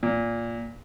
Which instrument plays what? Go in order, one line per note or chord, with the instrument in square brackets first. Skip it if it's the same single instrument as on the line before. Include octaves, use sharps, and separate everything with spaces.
[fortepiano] A#2